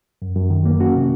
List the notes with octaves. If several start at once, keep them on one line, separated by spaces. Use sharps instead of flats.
F#2
F#2
D#3
A#3
C#4 F#4
C3